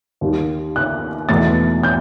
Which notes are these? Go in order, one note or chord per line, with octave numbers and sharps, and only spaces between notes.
D#2 D#3 G3
F#6
E2 B2 A3 A6
G6